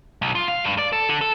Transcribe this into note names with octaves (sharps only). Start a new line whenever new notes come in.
B1
F4
F5
G2
D5
A4
D3
A4